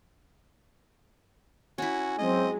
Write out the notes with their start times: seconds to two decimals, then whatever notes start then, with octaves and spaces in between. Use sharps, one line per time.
1.78 C#4 E4 F#4
2.18 F#3 G#3 C4 D#5